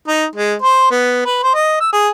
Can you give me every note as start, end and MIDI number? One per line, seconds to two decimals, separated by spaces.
0.08 0.25 63
0.36 0.55 56
0.62 0.90 72
0.91 1.22 59
1.26 1.40 71
1.43 1.51 72
1.54 1.79 75
1.80 1.93 88
1.93 2.09 68